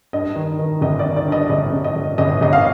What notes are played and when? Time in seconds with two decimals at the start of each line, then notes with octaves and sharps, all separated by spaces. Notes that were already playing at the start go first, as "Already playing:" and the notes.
0.13 G2 D#5
0.35 D#3
0.59 D#3
0.81 G1 D#5
0.99 D5
1.04 D#3
1.16 D5
1.27 G2
1.32 D#5
1.49 G1 D#5
1.73 G1
1.84 D#5
1.96 G1
2.18 G1 D#5
2.41 G1 D#5
2.53 F5